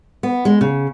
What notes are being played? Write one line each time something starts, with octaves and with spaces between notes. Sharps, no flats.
B3
G#3
C#3